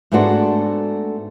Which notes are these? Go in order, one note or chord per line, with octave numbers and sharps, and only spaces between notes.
G#2 A3 B3 D4 F#4 C5